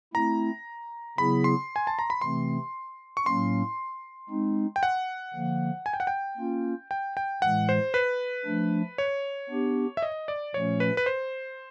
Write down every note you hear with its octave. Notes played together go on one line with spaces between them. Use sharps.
A3 C4 E4 A#5
C#3 F#3 B3 E4 G#4 B5
C6
G#5
A5
A#5
B5
C3 E3 A3 C4 C6
C#6
A2 F#3 A#3 C#4 C6
G#3 C4 D#4
G5
F#5
D3 F3 A#3
G#5
G5
F#5
G5
A#3 C#4 F4
G5
G5
A2 E3 G#3 F#5
C5
B4
F3 A3 D4
C#5
B3 D4 G4
E5
D#5
D5
A#2 F3 A3 C#4 C#5
B4
B4
C5